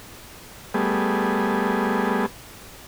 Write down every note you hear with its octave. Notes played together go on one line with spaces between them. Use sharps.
G3 A3 B3 G#4